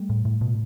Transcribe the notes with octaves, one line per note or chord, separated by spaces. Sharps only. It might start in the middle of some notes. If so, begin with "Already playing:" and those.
Already playing: G3 A3
A2
A2
B2